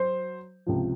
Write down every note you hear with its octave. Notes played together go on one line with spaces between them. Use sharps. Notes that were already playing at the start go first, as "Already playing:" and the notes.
Already playing: F#3 C5
C#2 C3 F3